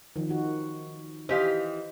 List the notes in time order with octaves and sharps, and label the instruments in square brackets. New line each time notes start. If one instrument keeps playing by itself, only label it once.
[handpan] D#3 F3
D#4 F#4
[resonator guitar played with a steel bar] E3 G4 F5 [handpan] C5 D#5